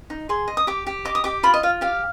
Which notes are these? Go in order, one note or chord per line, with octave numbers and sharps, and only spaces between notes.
D#4
G#4 C6
D#5
D#6
G4 D6
G4
D#5 D6
D#6
G4 D6
F4 B5
D#5
F4 F5
G4 F5